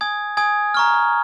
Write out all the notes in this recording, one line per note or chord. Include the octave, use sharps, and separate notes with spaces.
G#5 D#6 G#6
G#5 D#6 G#6
A#5 C#6 F6